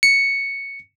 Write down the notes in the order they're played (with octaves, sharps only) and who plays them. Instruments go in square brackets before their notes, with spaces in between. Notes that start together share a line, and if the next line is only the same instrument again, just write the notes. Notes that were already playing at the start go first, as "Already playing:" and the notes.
[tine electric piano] C#7